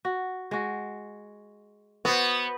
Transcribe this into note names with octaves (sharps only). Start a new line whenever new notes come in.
F#4
G#3 F#4
B3 F#4 C5